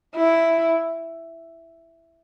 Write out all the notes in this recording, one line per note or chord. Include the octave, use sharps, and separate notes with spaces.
E4